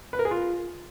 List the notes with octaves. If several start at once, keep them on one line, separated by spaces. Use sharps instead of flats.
B4
A#4
G#4
F4